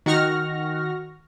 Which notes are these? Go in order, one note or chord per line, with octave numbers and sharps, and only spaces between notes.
D#3 F#4 F#5 C#6 F6 A#6